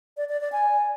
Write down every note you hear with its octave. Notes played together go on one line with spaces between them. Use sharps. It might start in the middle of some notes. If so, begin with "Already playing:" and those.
D5
D5
D5
G#5